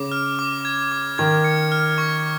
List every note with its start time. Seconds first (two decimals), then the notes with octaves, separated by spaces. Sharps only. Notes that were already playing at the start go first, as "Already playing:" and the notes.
Already playing: C#3 D6
0.12 F6
0.39 D6
0.65 G#6
0.92 D6
1.18 D#3 G#6
1.44 C#7
1.72 F6
1.98 C#6